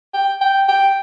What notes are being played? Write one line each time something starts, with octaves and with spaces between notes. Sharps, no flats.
G5
G5
G5